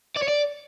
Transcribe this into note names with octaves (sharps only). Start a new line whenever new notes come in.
D5
C#5
D5